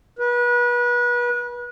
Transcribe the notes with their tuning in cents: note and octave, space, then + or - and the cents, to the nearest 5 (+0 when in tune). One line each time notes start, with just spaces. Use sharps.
B4 -30